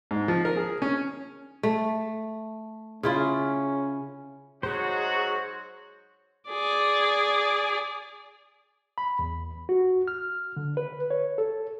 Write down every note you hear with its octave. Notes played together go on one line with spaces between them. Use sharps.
G#2
F3
A#4
G#4
C#4
A3
C#3 C#4 E4 F4
G#2 F#3 F#4 G#4 C5 C#5
G#4 D5
B5
E2
F#4
F6
D3
B4
C#5
A4